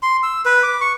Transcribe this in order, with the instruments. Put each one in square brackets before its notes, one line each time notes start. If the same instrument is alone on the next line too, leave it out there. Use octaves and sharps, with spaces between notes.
[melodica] C6
E6
B4
D6
C#6